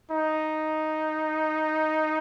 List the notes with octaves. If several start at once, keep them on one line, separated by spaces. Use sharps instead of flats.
D#4